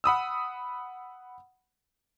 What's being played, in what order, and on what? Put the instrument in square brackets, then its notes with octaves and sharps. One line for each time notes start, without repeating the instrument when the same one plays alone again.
[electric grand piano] F#5 B5 D#6 E6